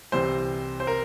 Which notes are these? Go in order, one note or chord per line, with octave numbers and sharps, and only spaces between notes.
C2 C3 E3 C5
C5
A#4